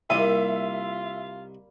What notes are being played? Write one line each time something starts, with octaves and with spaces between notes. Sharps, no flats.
C2 G3 A#3 D#4 F4 E5 D#6